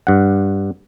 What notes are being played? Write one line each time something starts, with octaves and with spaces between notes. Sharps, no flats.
G2 F#5